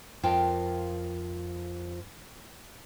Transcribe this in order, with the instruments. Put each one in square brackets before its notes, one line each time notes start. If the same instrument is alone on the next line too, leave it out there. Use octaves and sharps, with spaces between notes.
[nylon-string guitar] F2 F4 A#4 G5 A5